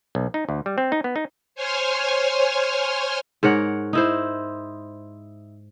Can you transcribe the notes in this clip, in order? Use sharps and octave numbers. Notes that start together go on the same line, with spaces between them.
B1
D#4
D2
G3
C4
D#4
B3
D#4
C5 C#5 G#5 C6 F6
G#2 A#4 C#5 F#5
D#4 E4 C5